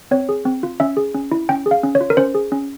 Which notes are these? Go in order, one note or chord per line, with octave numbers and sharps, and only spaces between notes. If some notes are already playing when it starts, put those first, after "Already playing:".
C4 C#5
G#4
C4
F4
C#4 E5
G#4
C#4
E4
C#4 G5
G#4
F5
C#4
C#5
F4
A#4
C#4 C5
G#4
C#4